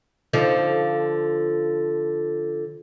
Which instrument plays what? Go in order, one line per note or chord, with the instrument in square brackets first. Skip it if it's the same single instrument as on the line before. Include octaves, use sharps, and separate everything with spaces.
[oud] D3 F3 D#4